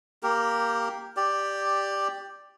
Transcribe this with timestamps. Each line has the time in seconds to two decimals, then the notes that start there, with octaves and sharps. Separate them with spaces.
0.23 A#3 G4 A#4
1.17 G4 D5